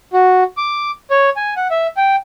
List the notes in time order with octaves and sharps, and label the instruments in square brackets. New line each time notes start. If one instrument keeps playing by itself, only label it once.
[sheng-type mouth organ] F#4
D6
C#5
G#5
F#5
E5
G5